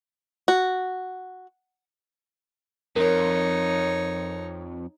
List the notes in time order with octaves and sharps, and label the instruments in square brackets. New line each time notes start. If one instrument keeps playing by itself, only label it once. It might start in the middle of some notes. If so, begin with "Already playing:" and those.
[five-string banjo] F#4
[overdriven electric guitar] F2 [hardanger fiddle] D#4 C#5 [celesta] A#4